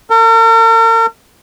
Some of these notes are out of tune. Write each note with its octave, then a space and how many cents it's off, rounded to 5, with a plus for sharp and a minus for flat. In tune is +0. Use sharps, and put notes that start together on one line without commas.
A#4 -45